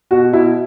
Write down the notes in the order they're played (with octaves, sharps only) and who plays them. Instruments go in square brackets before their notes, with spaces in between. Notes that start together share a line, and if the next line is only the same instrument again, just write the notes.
[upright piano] B2 F#4
B2 E4